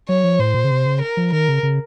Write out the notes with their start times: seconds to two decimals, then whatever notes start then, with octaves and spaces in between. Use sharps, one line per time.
0.09 F#3 C#5
0.24 F3
0.39 A2 C5
0.54 A#2
0.64 C#3
0.71 C3
0.86 C#3
1.02 A#4
1.17 F3
1.33 D#3 A#4
1.49 C#3
1.63 C#3